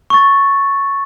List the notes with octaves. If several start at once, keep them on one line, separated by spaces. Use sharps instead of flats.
C#6 A6